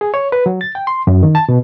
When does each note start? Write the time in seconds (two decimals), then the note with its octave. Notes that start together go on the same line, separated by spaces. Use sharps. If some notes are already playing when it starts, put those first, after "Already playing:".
0.01 G#4
0.14 C#5
0.32 B4
0.46 F#3
0.61 A6
0.75 G5
0.87 C6
1.07 F#2
1.23 D#3
1.35 A5
1.49 B2